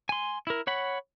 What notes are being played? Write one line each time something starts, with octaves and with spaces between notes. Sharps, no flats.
G#5 C6
E4 A#4
C#5 F#5 B5